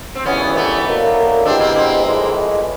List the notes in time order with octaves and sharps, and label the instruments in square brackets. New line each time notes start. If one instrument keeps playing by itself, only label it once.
[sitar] C4
[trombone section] G#1 G2 E3 [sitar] B3 C#4
[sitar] A3 B3
[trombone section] C2 B2 F#3 A#3
[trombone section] B2 G#3 B3 E4 G4 [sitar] C4 D4
[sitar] A#3 C4
A#3 C4
[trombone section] A#1 A2 E3 G#3